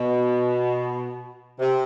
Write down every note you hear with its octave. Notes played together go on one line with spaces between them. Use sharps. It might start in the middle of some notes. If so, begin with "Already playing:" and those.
Already playing: B2
C3